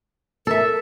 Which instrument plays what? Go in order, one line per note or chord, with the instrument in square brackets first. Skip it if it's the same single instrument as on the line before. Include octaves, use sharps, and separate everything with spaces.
[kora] A4 E5 [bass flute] A#4